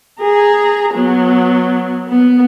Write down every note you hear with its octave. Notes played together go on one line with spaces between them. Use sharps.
G#4 A#5
F#3 B3
B3